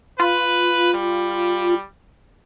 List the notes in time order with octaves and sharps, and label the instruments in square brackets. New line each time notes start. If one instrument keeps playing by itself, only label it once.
[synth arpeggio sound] F4 [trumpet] B4
[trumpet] G3